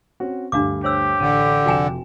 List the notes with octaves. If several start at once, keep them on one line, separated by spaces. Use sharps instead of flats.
C4 C#4 F#4
D2 G2 D4 F5 D6
G4 C5 C#5 E6
A1 D3 D#7
F1 F3 F#4 G5 G#5 E7